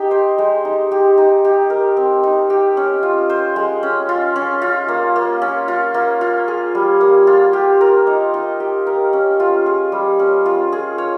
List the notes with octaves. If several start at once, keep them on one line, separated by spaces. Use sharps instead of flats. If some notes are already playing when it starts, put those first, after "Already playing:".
Already playing: D#4 G4
C5
G#3
D#4
G4
D#4
G4
A#4
C4
D#4
G4
C#4
F4
C5
G#3
C#4
F4
C#4
F4
A#3
A#3
C#4
F4
A#3
F4
G#4
G3
A#3
F4
G4
A#4
D#4
D#4
G4
A#4
C#4
F4
G#4
G3
C#4
F4
G#4
C#5